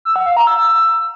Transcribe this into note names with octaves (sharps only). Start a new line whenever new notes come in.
E6
F#5
F5
A#5
E6